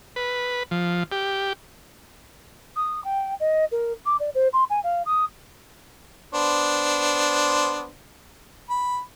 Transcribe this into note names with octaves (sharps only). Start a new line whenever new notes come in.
B4
F3
G4
D#6
G5
D#5
A#4
D6
D5
C5
C6
G#5
F5
D#6
B3 D4 C5
B5